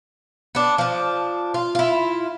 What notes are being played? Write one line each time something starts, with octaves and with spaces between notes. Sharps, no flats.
B3 D4
F3 D4
F4
E4 F4